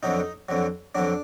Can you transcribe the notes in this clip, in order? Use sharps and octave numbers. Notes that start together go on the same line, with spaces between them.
F2 D3 F#3 D#4
F2 D3 F#3
F2 D3 F#3 D4